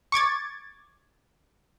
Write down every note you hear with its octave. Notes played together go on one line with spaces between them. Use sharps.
C#6 D6 G#6 A6